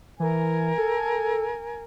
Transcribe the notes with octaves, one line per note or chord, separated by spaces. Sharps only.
E3 A#4 G#5
A4